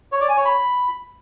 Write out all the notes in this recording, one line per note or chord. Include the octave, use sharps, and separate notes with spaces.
C#5
D5
G#5
C#5
B5